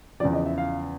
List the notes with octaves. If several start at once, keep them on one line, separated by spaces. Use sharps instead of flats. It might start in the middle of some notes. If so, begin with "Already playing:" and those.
E2 C#3 F3 D5
D#5
E5
F5